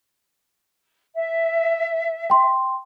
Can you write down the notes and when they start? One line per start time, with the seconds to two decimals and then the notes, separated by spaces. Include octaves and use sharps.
1.14 E5
2.30 G5 C6